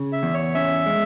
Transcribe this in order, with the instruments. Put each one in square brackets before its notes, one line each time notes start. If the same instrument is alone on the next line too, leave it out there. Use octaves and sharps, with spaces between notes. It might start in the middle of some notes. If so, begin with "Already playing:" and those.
Already playing: [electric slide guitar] C#3
[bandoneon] E5
[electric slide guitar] E2
[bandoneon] C#5
[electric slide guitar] C#4 [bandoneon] E5
[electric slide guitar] G#3